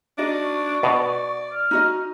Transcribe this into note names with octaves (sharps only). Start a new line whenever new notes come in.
D4 D#4 F#4 D#5
C#6
B2 D5
F6
D#4 F#4 D#5